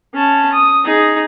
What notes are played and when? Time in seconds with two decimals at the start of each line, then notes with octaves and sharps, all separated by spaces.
0.14 C#4 A5
0.53 D#6
0.84 D#4 G#4